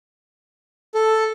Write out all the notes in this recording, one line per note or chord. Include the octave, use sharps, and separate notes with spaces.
A4